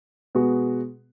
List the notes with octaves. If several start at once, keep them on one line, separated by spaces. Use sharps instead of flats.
B2 G#3 B3 F#4